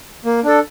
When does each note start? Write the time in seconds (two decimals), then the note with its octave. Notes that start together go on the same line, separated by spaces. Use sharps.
0.25 A#3
0.44 D4 A4